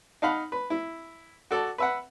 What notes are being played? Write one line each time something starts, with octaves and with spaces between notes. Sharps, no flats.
D#4 F5 F#5 B5
B4
E4
F#4 A4 D5
B4 E5 F#5